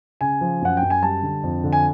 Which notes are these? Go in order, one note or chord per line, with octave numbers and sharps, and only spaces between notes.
C#3 G#5
F3
F#2 F#5
F#2 G5
G#5
G3 A5
D3
F2
D3
G#5